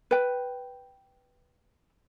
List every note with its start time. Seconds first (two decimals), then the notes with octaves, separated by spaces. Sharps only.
0.11 B4 G5